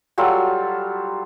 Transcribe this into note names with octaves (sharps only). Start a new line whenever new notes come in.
F#3 G3 F4 A4